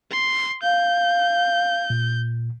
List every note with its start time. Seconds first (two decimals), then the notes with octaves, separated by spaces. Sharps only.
0.12 C6
0.63 F5 G6
1.90 A#2